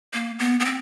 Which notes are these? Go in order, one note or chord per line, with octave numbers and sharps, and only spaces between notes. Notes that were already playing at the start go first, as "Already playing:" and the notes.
A#3
B3
B3
C4